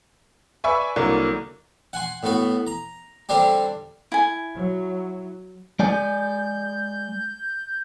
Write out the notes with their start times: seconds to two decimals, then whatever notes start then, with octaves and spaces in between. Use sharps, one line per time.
0.64 B4 D5 E5 G#5 C#6
0.96 C2 D3 F#3 A#3
1.93 F#5 G#5 C6
2.23 A2 B3 F#4
2.67 A#5
3.29 D3 G3 C4 D4 G4
4.12 E4 G#5
4.55 F#3
5.79 G#3 D5 G#5 G6